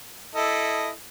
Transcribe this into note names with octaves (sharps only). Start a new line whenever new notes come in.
E4 A4 D#5